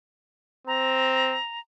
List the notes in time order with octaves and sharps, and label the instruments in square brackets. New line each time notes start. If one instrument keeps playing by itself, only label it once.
[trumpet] C4 [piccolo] A#5